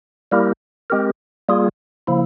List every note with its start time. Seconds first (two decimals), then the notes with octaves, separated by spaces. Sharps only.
0.32 G3 A#3 E4 G4 A#4
0.90 G#3 C4 G4 A#4
1.49 G3 A#3 F4 G#4
2.07 C#3 F3 A#3 E4